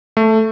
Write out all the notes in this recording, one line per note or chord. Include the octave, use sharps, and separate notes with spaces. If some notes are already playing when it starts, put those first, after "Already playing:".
A3